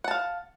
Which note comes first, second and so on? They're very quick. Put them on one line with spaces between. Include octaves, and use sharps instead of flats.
F#5 A5 F5